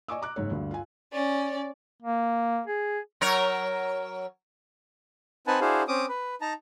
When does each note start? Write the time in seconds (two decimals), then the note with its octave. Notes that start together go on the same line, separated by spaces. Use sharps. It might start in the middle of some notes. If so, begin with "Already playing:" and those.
0.08 D5 D#5 G#5 C#6 D6 E6
0.22 A#5 D6 F#6
0.36 F#1 G#2 C#5
0.51 D2 G2
0.71 F4 G#5
1.12 C#4 D5
2.02 A#3
2.67 G#4
3.21 F#3 A#4 C#5
5.47 C4 D#4 B4 F#5 G#5 A5
5.61 D4 E4 F#4 G#4 C5 F5
5.88 C4 C#4 D6 D#6
6.09 B4
6.41 D#4 A5 A#5